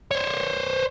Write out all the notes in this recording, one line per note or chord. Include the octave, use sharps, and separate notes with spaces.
C5 C#5